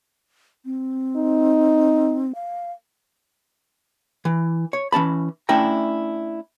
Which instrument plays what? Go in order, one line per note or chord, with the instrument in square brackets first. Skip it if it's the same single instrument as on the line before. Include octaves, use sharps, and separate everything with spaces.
[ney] C4
[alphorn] D#4
[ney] F5
[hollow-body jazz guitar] E3
C#5
E3 C#4 A5 B5
A3 C#4 D4 E4 G5 A#5